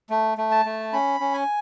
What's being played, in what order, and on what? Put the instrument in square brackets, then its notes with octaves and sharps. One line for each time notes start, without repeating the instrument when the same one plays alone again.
[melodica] A3
A3
A5
A3
C#4 B5
C#4
G#5